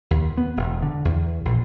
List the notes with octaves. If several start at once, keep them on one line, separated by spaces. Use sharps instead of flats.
D#2
B3
E1
D3
E2
A#1